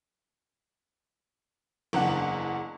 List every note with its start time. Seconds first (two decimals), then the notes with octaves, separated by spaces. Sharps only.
1.93 F#1 E2 D4 F#5